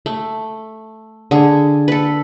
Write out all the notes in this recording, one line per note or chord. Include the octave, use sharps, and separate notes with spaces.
A3
D3 G#4
A4 B4